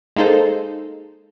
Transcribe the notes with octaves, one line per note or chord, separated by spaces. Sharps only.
G#3 A#3 D#4 A4 C5